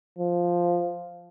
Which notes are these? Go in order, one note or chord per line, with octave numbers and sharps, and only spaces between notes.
F3